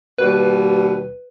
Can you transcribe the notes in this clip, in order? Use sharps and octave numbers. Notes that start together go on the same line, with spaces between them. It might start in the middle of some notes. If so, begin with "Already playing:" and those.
D#2 B2 G3 B4